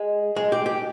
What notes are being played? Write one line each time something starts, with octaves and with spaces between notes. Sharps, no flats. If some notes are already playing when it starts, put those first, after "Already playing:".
Already playing: G#3
G#3
G4
G4